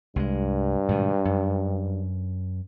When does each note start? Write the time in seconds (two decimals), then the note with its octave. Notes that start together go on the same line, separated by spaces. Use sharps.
0.16 C2 G2 E3 G#3
0.88 G#2 B2 D#3
1.25 F#2